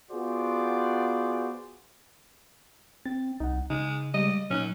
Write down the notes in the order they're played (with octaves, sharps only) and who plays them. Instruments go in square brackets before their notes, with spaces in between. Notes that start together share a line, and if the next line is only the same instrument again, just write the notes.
[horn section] B3 F4 F#4 G#4 C5 D5
[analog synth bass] C4 [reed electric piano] A6
[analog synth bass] C2 [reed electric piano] D#4 F#5
[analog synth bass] C#3 [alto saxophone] G#3 [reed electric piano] D#4
[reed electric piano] G3 G#3 [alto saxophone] D#5
[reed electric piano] A#2 D#4 F#6 [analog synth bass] F#3 [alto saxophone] C#4